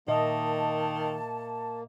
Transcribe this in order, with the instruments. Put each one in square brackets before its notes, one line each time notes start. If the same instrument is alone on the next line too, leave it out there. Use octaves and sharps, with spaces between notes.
[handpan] A#2 D#5 E5 [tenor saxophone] D#3 [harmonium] A#3 [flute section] A5